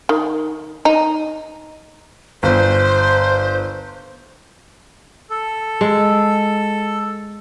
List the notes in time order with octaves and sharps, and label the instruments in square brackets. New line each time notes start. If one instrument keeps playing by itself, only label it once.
[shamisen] D#3
D#4
[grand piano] G1 [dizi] C5
[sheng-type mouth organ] A4
[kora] G#3